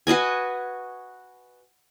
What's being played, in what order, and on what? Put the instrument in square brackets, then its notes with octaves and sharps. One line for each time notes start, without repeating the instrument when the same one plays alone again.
[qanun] F#4 B4 D#5 G#5